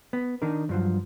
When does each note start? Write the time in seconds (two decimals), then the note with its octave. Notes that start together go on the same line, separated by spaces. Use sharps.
0.13 B3
0.42 D#3 D4 D#4 A#4
0.69 G2 F3 F#3